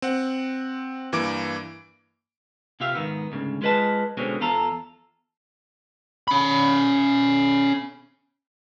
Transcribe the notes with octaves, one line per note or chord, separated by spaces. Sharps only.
C4 F#5
G2 E3 A#3 D6 D7
C3 F4 G4 E5 F5
G#2 D#3 B3
D2 G#2 C#3
G#3 F4 B4 D#5 A5
B2 D3 G#3 C4 C#4
E2 F4 A4 A#5
C#4 B5